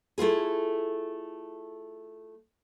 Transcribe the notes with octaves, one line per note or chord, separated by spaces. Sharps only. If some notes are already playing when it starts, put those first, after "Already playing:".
A3 E4 F4 G#4